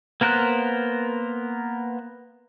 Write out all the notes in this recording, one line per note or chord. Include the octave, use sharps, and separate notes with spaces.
A#3 B3 A#4 C5 F#6